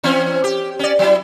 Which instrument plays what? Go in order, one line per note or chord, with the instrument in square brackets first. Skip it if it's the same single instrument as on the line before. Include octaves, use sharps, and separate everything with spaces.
[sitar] E3 C4 C#4
G4
C#4 D5
F#3 E4